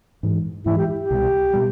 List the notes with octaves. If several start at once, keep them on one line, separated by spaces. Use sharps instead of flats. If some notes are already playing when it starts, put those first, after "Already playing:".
G#2 E3 G#3
G#2 E3 G#3 E4
G4
G4
C2 B2 G3
B2 G3